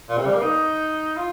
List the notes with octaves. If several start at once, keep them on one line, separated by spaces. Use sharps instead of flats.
A#2
C3
G3
A#3
D#4
F4